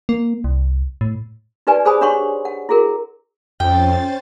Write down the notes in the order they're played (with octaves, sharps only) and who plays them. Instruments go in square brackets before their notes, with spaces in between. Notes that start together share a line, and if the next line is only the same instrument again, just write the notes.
[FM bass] A#3
C2
A2
[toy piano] D#4 G4 B4 D5 G#5
G#4 C5 G#5 B5 D#6
D4 G4 C#5 F#5 C6 C#6
F#5
E4 F#4 G#4 A#4
[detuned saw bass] F2 [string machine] C#4 C5 A6 [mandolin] G5